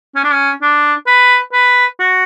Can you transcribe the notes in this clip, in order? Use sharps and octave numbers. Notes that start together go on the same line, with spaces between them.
C#4
D4
C#4
D4
B4
B4
F#4